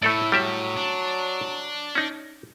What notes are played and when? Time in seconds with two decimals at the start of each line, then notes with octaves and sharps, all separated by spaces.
0.02 A2 A3 E4 A4 D5
0.32 F#3 G3 G4 E5
0.77 D4
1.95 C#4 D#4